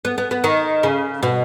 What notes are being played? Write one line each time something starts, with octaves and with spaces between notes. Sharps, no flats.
B3
B3
B3
D#3
C#3
B2